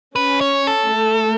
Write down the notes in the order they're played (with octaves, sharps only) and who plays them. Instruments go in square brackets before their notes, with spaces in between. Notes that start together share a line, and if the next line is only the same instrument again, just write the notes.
[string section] C#4 [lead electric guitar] B4
[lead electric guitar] C#5
A4
[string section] A3